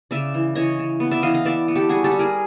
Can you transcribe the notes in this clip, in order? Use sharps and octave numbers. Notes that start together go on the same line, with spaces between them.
C#3 D5 E5
E3
E3 C#5 D#5
C#3
B3
D5 E5
E3 D#5 F5
D#5 F5
B3 D5 E5
B3
G4 A4
G3 F#4 G#4
G4 A4
G3
G#4 A#4